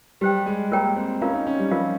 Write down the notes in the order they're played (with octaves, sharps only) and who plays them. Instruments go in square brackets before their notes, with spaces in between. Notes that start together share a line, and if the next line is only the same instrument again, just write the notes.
[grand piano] G3 [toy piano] G4 C5 G5
[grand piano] G#3
[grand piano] A#3 [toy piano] F4 A#4 C#5 G5 A#5
[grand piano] C4
[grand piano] C#4 [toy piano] F4 A#4 F5 A#5
[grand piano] D#4
C#4
G3
[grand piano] F3 [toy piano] F4 A#4 F5